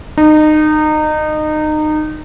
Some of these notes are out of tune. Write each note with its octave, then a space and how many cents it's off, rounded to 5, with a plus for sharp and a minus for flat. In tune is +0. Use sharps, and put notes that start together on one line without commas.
D#4 -25